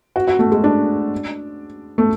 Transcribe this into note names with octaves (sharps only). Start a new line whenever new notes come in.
F#4
F#4
A3
G#3
D4
A3